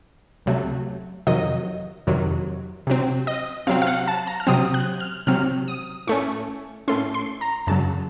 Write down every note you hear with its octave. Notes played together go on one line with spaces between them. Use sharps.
C#2 C3 F#3 A3
F2 C3 D#3 F#3 D#5
F2 C3 D#3 F#3
C3 F#3 C4
D#5
C3 F#3 C4 F5
F5
F#5
A5
A#5
F6
C3 F#3 C4 D#6
F#6
F6
C3 F#3 C4 F6
D#6
A2 A3 C#4 C#6
A2 A3 C#4 C6
C6
A#5
F#2 C#3 F#3 A5